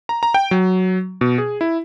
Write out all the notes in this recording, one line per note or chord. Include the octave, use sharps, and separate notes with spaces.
A#5
A#5
G5
F#3
B2
G#4
E4